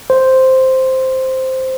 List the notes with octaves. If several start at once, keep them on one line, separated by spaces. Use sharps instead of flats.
C5